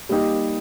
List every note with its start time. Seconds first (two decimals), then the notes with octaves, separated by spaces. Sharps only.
0.09 G3 A#3 D#4 G4